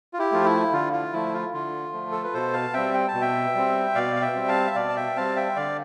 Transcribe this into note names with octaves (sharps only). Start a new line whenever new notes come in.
F4
E4 G4
F3 A3 F4
E4
D3 F4
F4
F3 A3 E4
F4
D3 F4
F3 A3
A4
B4
B2 A4 C5
F5 A5
G3 C4 E5 G5
G5
A5
B2
E5 G5
G3 C4
B2 D5 F5
F5
E5 G5
G3 C4
F5 A5
E5
B2 D5 F5
A5
E5 G5
G3 C4 F5 A5
E5 G5
D3 D5 F5